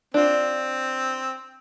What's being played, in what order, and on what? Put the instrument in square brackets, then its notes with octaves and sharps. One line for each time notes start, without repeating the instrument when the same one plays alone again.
[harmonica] C4 [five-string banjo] D4 F4